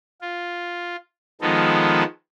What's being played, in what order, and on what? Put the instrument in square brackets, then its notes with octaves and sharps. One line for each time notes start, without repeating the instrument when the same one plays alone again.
[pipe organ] F4
D#3 F3 G#3 B3 D#4 A4